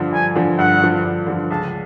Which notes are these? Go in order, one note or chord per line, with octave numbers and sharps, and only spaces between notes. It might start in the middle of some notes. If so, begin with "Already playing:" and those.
Already playing: G2 D3 F3
G2 G#5
D3 F3
G2 F#5
D3 F3
G2
D3 F3
C#2 A5